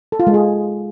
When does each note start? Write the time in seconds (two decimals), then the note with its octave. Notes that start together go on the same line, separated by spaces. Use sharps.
0.12 A4
0.20 F4
0.27 G#3
0.34 G#4